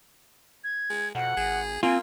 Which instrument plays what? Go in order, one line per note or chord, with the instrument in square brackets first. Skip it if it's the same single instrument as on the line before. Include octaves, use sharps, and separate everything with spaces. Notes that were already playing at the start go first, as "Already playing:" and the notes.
[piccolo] G#6
[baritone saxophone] G#3
[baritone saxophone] F2 [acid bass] B2 [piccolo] F#5
[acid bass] G#1 [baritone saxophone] G#4
[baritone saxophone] A#3 [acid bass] C4 [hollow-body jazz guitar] F4 [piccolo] G#5